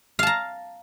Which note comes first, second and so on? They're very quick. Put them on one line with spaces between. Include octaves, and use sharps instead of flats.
F5 A5 A#5